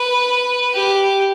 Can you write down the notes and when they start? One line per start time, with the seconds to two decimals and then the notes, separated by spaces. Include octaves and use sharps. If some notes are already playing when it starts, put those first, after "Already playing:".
Already playing: B4
0.74 G4